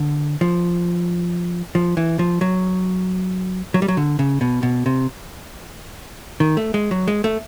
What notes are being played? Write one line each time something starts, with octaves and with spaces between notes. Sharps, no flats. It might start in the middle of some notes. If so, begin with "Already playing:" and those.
Already playing: D3
F3
F3
E3
F3
F#3
F#3
G3
F#3
D3
C#3
B2
B2
C3
D#3
A3
G#3
F#3
G#3
A3